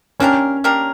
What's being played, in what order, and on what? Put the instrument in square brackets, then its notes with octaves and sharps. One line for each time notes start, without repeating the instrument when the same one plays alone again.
[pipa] A#3 D4 G4 A#4 [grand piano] C#4
[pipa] A#3 D4 G4 A#4